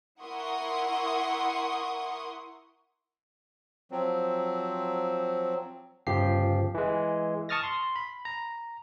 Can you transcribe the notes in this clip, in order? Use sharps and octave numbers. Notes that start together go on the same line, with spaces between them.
E4 A#4 F#5 C6 C#6 D#6
F3 F#3 C4
G1 C#3 F3 G4 C7
E3 G#3
A5 C#6 D#6 F6 A6 A#6
C6
B5
A#5